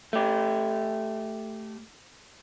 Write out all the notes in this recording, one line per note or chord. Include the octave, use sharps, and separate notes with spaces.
A3 G4